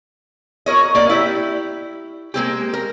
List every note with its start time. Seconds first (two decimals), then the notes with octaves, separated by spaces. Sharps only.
0.66 F#4 A#4 C#5 D#5
0.95 A#3 D5
1.09 E4 G4 E5
2.34 G#3 A#3 C4 G4
2.73 A#4